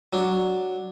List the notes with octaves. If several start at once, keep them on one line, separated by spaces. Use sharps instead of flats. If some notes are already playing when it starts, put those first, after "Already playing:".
F#3 D4